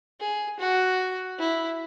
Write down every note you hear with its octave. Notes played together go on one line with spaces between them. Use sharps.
G#4
F#4
E4